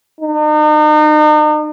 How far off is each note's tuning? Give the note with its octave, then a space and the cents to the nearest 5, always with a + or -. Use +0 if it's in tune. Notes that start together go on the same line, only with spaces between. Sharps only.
D#4 -40